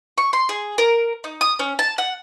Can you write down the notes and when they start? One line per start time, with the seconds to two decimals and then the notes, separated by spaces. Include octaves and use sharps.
0.18 C#6
0.33 C6
0.49 G#4
0.78 A#4
1.24 D#4
1.41 D#6
1.59 C#4
1.79 A5
1.98 F#5